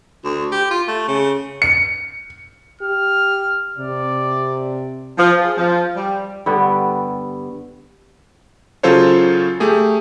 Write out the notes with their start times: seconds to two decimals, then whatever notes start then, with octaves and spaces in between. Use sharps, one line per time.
0.25 D2
0.52 G4
0.71 F4
0.88 A3
1.08 C#3
1.62 C#7
2.81 G4 F6
3.78 C3 D5
5.18 F3
5.43 G#4
5.58 F3
5.96 G3
6.46 G2 D3 G3 B3
8.83 C#3 F#3 F4 A4 C5 C#5
9.60 A3 G4 G#4